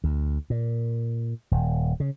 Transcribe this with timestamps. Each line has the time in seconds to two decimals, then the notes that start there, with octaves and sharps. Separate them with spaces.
0.04 D2
0.50 A#2
1.51 D#1
2.00 C#3